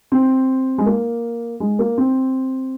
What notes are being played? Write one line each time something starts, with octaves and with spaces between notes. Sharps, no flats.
C4
G#3
A#3
G#3
A#3
C4